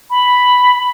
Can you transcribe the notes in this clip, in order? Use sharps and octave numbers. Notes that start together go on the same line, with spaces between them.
B5